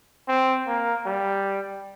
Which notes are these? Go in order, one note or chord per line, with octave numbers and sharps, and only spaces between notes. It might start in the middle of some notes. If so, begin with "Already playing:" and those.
C4
A#3
G3